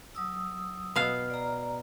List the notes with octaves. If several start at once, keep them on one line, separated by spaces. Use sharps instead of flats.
F#3 D#6 E6
B2 F5
D5 A#5